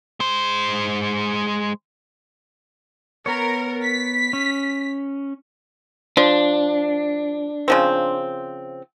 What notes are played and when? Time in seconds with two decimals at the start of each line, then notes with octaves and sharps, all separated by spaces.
0.20 G#3 C5
3.26 B3 A#4 C#5
3.84 B6
4.33 C#4
6.17 F3 D4
7.68 C#3 F3 C4